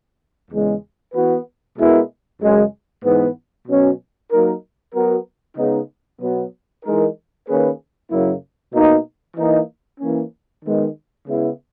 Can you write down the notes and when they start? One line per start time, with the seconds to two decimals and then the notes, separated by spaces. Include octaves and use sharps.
0.51 E2 C#3 G#3
1.14 E3 B3 F#4 B4
1.77 B2 G#3 B3 E4 A#4
2.41 F#2 C#3 G#3
3.04 G#2 E3 B3
3.67 B2 F#3 C#4
4.30 F#3 A#3 D#4 A#4
4.94 F#3 B3 F#4 A#4
5.57 C#3 G#3 B3 D#4
6.21 B2 F#3 B3
6.84 E3 G#3 D#4 A#4
7.47 D#3 A#3 C#4 G#4 B4
8.11 F#2 C#3 F#3 A#3 E4
8.73 B2 A#3 D#4
9.37 E3 A#3 D#4
10.00 E3 A#3 C#4
10.64 D#3 G#3 B3
11.27 C#3 G#3 B3 E4